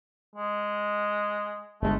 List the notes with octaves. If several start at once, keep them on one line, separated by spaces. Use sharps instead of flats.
G#3
G1 G#3 A3